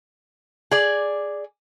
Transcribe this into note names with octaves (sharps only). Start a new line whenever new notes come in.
G#4 D5